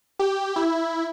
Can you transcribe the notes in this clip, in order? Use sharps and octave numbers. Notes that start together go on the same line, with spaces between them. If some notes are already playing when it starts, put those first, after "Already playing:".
G4
E4